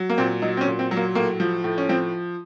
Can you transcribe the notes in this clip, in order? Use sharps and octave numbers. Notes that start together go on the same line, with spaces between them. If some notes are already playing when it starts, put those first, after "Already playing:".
Already playing: F#3
A#3
A#2 C4
F#3 D#4
C4
C#4
A#2
C4
F#3
A#3
A2 A#3
F3
A2
C#4
F3 C4